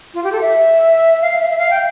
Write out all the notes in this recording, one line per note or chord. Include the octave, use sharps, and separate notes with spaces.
F4
G4
A4
E5
F5
F5
E5
E5
F5
G5